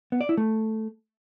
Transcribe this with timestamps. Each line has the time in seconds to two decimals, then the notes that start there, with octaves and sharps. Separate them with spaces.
0.12 B3
0.21 D5
0.29 E4
0.38 A3